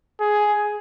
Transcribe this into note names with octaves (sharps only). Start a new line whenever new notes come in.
G#4